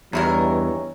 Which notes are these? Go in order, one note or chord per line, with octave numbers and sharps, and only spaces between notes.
E2 G2 G3 D#4 E4 A#4 C#5